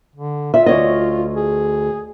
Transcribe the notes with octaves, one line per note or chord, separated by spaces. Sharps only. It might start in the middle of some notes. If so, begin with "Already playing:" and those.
D3
F4 E5
D2 C#5 D#5
G#4